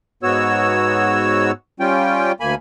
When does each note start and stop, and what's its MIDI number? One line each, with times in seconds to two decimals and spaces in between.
0.23 1.51 44
0.23 1.51 59
0.23 1.51 66
0.23 1.51 73
0.23 1.51 88
1.80 2.32 55
1.80 2.32 61
1.80 2.32 65
1.80 2.32 79
2.40 2.55 38
2.40 2.55 58
2.40 2.55 80
2.40 2.55 83